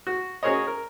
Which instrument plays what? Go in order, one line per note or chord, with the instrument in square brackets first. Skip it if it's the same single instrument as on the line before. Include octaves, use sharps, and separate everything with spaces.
[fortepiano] F#4
C#4 F#4 G#4 A#4 C#5 D#5
A#4